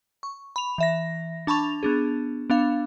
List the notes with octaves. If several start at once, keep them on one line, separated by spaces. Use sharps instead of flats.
C#6
B5 F7
E3 E5 A#6
D4 A5 B5 C#6 F7
B3 D4 G#4
B3 D4 F5